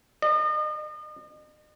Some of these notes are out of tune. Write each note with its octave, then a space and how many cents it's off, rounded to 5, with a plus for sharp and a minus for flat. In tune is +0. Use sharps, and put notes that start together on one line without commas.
D#5 -40